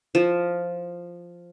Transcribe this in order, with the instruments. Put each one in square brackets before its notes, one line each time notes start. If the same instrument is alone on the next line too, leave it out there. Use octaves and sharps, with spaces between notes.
[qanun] F3